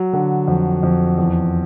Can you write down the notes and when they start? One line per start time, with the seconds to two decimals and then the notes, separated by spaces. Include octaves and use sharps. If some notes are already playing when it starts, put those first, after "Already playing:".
Already playing: F#3
0.13 D3
0.48 F2
0.83 F2
1.18 E2